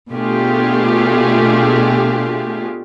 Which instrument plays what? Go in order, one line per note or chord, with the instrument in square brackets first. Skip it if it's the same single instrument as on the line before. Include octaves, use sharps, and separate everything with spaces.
[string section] B2 A3 D4 F4 G4 G#4